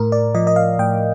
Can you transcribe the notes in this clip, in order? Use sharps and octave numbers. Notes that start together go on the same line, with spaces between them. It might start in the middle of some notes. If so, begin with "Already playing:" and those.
Already playing: A2 A#4
D5
F3 D#5
D#5
F5
A2 G5